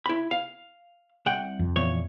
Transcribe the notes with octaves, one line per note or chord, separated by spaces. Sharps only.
E4 B5
F5
C2 F#5 G5
F2
E2 A#2 C#5